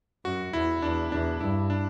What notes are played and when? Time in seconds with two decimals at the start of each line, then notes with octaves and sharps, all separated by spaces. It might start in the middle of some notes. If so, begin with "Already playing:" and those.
0.25 F#2 F#4
0.53 E2 E4
0.82 E2 D4
1.12 E2 D4
1.41 G2 E4
1.70 D4